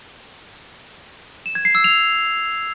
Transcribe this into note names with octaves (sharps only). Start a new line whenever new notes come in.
E7
G#6
C7
E6
F7